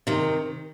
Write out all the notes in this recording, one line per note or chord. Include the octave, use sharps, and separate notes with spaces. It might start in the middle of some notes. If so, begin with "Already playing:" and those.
C3 D#3